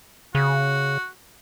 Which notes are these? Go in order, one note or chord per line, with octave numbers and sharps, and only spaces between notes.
C#3 F#4